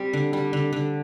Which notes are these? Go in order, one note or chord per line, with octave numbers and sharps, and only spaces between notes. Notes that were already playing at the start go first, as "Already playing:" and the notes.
Already playing: G3 C4 G4
D3
G3
D3
D3